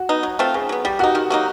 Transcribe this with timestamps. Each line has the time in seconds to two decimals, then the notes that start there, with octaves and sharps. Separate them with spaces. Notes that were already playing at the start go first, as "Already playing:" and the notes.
Already playing: F#4
0.09 B3 D#4
0.23 F#3
0.39 A3 C4 F4
0.54 C#3 G#4
0.69 F#3 B3
0.85 G3 G4
0.99 A#3 D#4 F#4
1.15 D#3
1.30 F#3 A#3 D#4